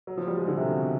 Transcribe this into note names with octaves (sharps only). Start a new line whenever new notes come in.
F#3
F3
G3
G#3
D3
C3
B2